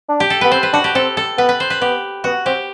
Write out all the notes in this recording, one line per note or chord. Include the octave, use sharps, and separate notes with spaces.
D4
G4
A4
B3 B4
C4 C5
B4
D4 F#4
G4
C4 A4
A4
B3 B4
B4
C5
B4
B3 G4
B3 F#4
C4 G4